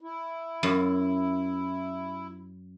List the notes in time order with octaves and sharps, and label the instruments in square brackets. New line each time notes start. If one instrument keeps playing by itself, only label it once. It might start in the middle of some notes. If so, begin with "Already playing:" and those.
[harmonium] E4
[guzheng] F#2